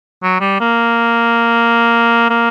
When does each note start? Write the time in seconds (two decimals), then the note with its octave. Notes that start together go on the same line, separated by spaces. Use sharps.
0.23 F#3
0.40 G3
0.60 A#3
2.30 A#3